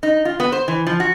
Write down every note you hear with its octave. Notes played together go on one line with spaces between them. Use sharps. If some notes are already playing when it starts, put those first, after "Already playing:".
D#4
F4
B3
C5
E3
F3
F#4